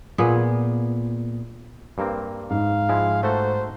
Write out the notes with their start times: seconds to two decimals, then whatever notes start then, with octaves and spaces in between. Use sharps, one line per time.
0.18 A#2 B3 G#4
1.98 G2 A#3 C4
2.50 G#2 F5
2.89 F3 G#3 E4
3.23 A3 F#4 A4 C5